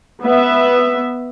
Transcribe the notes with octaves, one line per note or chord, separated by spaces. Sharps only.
B3 E5